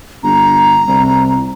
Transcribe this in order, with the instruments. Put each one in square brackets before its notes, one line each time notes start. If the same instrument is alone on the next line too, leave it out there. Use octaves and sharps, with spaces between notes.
[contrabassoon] G1 [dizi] A#5
[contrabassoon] C2